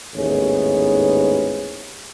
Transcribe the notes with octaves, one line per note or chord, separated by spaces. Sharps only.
A1 D#2 G#2 B3 G#4 C#5